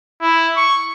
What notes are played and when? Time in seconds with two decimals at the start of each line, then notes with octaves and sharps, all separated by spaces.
0.22 E4
0.57 C#6